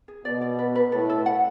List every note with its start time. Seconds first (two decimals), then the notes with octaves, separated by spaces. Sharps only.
0.08 G#4
0.25 B2 D5
0.41 D5
0.59 B4
0.75 B4
0.92 A2 A4
1.09 A4
1.26 F#5